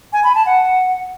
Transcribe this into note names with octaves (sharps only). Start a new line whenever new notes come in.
G#5
B5
A5
F#5